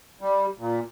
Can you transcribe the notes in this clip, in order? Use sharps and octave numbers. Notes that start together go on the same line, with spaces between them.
G3
A#2